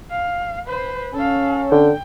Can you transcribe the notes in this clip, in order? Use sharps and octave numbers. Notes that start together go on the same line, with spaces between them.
F5
B4 C5
C#4 A4 F5
D3 G5